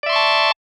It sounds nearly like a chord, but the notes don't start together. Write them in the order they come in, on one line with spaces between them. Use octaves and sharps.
D5 E5 C6 C#6 A5